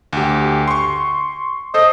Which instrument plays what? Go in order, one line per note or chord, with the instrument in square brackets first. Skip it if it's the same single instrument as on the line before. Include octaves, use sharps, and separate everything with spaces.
[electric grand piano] D2 G4
C6 C#6
[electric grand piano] A4 C5 [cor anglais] D#5